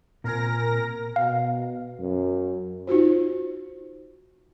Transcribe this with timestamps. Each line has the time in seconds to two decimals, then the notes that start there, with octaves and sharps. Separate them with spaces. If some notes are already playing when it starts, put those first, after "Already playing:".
0.24 A#2 C4 A#4 G#5 A#6
1.16 B2 F5
2.00 F#2
2.87 D#4 F4 F#4 C5